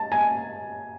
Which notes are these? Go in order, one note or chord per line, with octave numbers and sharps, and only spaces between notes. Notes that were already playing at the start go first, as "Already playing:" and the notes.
Already playing: A5
G#5